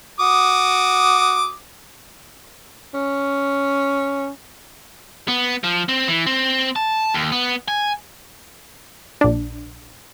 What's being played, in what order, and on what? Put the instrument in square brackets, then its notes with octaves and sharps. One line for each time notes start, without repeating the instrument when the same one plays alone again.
[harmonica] F#4 D6 D#6
[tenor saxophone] C#4
[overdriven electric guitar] B3
F3
C4
E3
C4
A5
D#2
B3
G#5
[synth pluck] A#1 D4